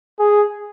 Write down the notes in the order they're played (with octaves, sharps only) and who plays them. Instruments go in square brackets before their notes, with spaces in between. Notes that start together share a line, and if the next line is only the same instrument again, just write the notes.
[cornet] G#4